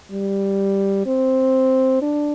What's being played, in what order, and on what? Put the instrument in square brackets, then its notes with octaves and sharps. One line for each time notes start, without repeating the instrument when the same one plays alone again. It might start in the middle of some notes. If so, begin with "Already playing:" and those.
[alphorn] G3
C4
D4